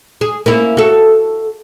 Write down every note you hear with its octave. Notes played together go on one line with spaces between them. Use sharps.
G#4
A#3 C#4 E4
F#4 A4